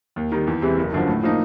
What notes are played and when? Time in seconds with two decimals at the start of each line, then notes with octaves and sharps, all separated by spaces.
0.16 D#2
0.32 D#3 G3
0.47 E2
0.62 C3 E3 G#3
0.77 F#1
0.93 F#2 D3 F3
1.08 A2
1.23 F3 A#3 D#4